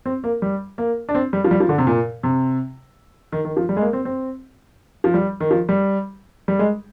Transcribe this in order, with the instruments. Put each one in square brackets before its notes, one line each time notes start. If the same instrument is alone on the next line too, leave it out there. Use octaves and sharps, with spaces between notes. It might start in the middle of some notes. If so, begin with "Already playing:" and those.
[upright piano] C4
A#3
G3
A#3
D4
C4
G3
F3
G3
F3
D3
C3
A#2
C3
D#3
D#3
F3
G3
G#3
A#3
C4
C4
F3
G3
D#3
F3
G3
G3
G#3